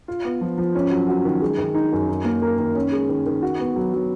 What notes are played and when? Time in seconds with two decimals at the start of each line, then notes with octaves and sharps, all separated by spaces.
0.08 F4
0.25 B3
0.41 F3
0.58 F3
0.75 C#4
0.91 F#3
1.08 F#4
1.25 D#3
1.42 G#3
1.58 D#3
1.75 D#4
1.92 F#2
2.09 D#4
2.25 A#3
2.42 A#4
2.58 D#3
2.75 C#4
2.92 G#3
3.09 D#3
3.26 D#3
3.42 F#4
3.60 B3
3.76 F#3
3.93 F#3